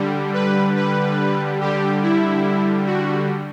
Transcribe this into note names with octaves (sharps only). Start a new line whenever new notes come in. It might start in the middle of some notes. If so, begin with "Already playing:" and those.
Already playing: D3 G3
B4
B4
D3 G3 G4
E4
F#4